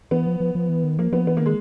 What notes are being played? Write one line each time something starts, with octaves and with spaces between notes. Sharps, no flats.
E3 B3
F3
F3
F3
E3
D#3
F3 A#3
F3 B3
E3 B3
D#3 A#3
G#3